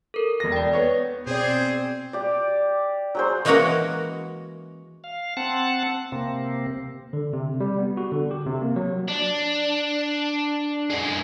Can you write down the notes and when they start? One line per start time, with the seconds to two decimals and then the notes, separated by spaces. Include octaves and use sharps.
0.14 A4 A#4
0.40 E1 A#6
0.52 D5 G5
0.73 B3 C#5
1.27 B2 C4 G#4 C5 D5
2.13 G4 D5
3.15 F#3 G#4 C5
3.45 E3 G#3 A#3 C#4 F#4 A#4
5.04 F5
5.37 C4 F#5 A5
6.12 C3 A#3 C4
7.13 D3
7.33 C3
7.60 G3
7.78 B3
7.97 F#4
8.12 D3
8.31 G4
8.46 C3
8.62 A#3
8.76 F#3
9.08 D4
10.90 F#2 G#3